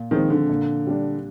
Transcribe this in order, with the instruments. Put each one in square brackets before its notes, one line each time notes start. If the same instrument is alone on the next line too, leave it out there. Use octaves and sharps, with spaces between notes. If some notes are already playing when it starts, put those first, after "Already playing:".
Already playing: [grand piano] A#2
[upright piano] D#3 [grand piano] F3 G#3 C4
[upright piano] D3
[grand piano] A#2
G3 D4